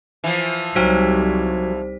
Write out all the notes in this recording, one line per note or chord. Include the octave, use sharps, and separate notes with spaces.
E3 F3
C2 F#3 G3 D#4 C5 B6